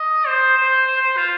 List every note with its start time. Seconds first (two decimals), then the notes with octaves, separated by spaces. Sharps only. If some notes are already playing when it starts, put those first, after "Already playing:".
Already playing: D#5
0.27 C5
0.57 C5
0.87 C5
1.01 C5
1.17 F4